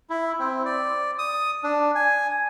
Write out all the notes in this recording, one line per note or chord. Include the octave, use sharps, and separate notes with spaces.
E4
C4
D5
D#6
D4
G#5